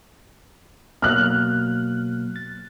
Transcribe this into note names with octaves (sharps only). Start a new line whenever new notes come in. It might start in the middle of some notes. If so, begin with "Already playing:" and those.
B2 F#3 A#3 F6 F#6
A6